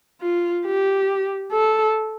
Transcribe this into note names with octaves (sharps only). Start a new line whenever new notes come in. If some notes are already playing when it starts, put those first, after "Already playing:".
F4
G4
A4